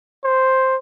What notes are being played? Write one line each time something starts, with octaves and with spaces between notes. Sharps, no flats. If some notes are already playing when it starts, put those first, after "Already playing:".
C5